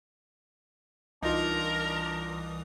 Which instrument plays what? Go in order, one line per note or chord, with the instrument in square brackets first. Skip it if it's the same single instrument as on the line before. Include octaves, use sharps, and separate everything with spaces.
[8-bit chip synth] C2 E3 D#6 [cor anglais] D4 [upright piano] D#4 F4 [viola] A#4 A#5